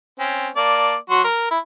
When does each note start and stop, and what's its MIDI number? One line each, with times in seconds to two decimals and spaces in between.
0.19 0.48 60
0.19 0.48 61
0.56 0.94 58
0.56 0.94 74
0.56 0.94 81
1.10 1.23 54
1.10 1.23 66
1.10 1.23 84
1.24 1.46 70
1.51 1.59 64